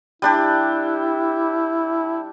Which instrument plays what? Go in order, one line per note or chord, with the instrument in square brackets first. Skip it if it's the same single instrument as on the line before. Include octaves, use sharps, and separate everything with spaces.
[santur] G3 D4 G4 [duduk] E4